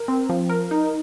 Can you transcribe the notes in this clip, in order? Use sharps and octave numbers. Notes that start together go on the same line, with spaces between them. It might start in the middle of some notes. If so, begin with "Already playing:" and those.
Already playing: A#4
C4
F3
A#4
D#4